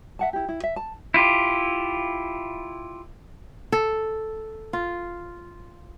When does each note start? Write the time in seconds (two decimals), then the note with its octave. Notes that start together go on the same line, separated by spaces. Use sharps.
0.19 E5 F#5 A5
0.33 E4 G4
0.49 E4
0.64 E5
0.76 A5
1.14 E4 F4 G4
3.72 A4
4.73 F4